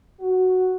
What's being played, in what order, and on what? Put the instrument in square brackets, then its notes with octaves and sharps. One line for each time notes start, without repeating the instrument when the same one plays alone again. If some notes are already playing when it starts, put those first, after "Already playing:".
[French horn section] F#4